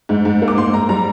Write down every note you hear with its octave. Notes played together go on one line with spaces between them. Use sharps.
G#2
G#2
A#3
D6
G#2 C6
G#2 A#5
G3 A#5